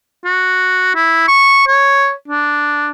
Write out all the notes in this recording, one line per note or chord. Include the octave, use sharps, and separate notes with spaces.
F#4
E4
C#6
C#5
D4